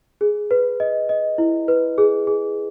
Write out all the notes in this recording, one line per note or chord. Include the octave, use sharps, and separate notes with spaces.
G#4
B4
D#5
D#5
E4
B4
G#4
G#4